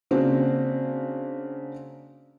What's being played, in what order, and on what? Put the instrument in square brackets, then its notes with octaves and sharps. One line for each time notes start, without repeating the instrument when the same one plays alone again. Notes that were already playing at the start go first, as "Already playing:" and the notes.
[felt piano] C#3 A#3 C4 D4 F#4